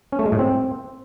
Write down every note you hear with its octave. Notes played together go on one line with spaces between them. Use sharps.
C#4
A3
G#3
A2
C4